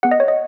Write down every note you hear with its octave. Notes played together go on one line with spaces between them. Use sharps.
B3 G#4 F#5
D#5
C#5
D#5